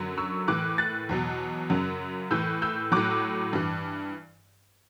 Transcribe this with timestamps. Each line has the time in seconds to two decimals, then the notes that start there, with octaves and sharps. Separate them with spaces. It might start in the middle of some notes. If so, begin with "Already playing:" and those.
Already playing: F#2 D3 F#3
0.18 C#6 E6
0.48 A2 E3 D6 F#6
0.78 F#6 A6
1.09 E2 B2 F#3
1.70 F#2 C#3 F#3
2.31 A2 E3 E6 G6
2.62 E6 G6
2.92 A2 F#3 D6 F#6
3.53 G2 E3